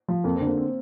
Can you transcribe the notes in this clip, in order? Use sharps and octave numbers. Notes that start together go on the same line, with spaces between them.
F3
F2 A#3
C4
D3
A#3
C4